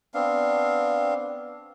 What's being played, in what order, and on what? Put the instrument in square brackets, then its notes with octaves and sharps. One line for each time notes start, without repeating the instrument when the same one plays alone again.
[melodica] B3 C4 D4 F5